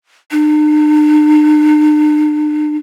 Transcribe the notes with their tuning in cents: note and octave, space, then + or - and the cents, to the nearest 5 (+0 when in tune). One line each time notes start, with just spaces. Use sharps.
D4 +45